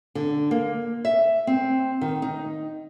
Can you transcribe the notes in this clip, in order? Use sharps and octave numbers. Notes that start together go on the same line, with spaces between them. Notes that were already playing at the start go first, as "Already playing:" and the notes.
D3
A#3
E5
C4
D#3
D#4